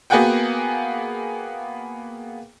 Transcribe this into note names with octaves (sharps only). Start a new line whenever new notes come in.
A#3 B3 F#4 G#4 F#5 G5